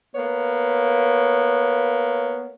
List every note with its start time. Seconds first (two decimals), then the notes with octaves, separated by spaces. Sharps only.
0.15 A#3 B3 C#5